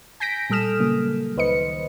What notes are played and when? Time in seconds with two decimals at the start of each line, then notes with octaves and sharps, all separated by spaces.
0.20 G#5 G6 A#6 B6 D7
0.50 A#2 G3 A4 D#6 F6 E7
0.79 C#3 F#3 G3 A#3
1.36 C#2 D#3 B4 C5 D#5 C#7